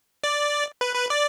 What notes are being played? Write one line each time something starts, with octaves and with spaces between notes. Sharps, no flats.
D5
B4
B4
D5